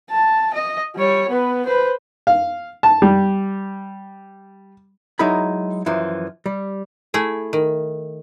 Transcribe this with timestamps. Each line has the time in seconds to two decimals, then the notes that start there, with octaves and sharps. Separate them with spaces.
0.10 A5
0.54 D#5
0.96 G3 C#5
1.30 B3 B4
1.66 B4 C5
2.27 F5
2.83 A5
3.02 G3
5.19 F#3 G#3 D#4 E4 A#4 B5
5.86 F#2 E3 F3
6.46 G3
7.14 A3 E4 G#4
7.53 D#3